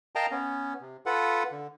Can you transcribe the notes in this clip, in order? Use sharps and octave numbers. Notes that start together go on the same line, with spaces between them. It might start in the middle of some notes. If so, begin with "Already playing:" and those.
A#4 D#5 F5 G5 A5 A#5
B3 C#4
C3
F4 A4 B4 F#5
D3